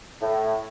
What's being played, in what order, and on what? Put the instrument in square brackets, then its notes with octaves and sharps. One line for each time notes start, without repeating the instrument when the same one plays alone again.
[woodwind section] A2